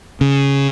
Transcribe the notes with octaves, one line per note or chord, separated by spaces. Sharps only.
C#3